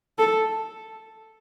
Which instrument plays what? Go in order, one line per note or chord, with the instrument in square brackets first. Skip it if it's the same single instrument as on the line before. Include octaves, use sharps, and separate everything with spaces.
[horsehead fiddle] A4